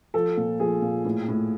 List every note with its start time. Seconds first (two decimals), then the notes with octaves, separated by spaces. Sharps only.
0.14 F3 A4
0.37 A#2
0.60 F3 G#4
0.82 A#2
1.05 A2
1.28 A2